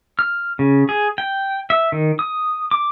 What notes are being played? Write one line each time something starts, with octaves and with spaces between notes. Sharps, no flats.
F6
C#3
G#4
G5
E5
D#3
D#6
D6